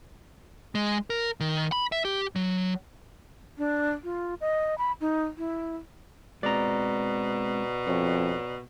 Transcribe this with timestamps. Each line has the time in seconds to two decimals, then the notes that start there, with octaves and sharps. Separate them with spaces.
0.75 G#3
1.10 A#4
1.40 D#3
1.72 B5
1.92 E5
2.05 G4
2.36 F#3
3.58 D4
4.04 F4
4.41 D#5
4.78 B5
5.01 D#4
5.38 E4
6.43 B2 G#3 C4 D5 A#5
7.87 F2 C#5